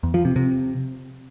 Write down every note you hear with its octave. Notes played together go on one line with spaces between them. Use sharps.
E2
F3
C3
C3